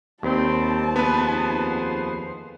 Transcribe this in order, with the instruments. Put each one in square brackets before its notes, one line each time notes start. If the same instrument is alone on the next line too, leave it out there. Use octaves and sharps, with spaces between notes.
[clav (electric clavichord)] D#2 [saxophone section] G3 C4 [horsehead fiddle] D#4 A5
[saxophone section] F2 G#4 C5 [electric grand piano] B3 B4